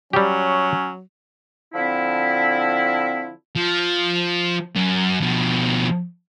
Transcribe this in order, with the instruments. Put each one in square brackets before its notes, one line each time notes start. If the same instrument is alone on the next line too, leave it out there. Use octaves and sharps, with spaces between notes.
[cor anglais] F#3 [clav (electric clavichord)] G3 G4 [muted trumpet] C#4
[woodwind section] D3 F3 C4 E4
[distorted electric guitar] F3
F#2
B2 F3